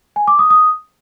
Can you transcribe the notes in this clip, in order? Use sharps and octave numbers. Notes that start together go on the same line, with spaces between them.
G#5
D6
D#6
D#6